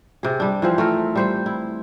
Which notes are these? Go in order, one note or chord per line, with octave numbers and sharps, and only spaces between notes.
C3 G#4
G3 D4
E3 F3 C4
A3 A4 A#4
G3 C5 G5
E4